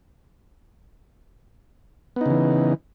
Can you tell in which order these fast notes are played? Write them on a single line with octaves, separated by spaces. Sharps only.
B3 D#4 C#3 E3